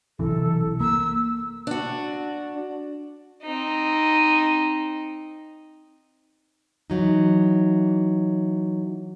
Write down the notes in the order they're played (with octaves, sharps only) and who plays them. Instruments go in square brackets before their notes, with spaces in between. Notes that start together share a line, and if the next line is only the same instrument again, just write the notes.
[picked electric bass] B1 C3 E3 [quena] A4
[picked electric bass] A#3 [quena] E6
[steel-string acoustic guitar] D4 F#4
[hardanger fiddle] C4 D#4
[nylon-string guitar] E3 F#3 D#4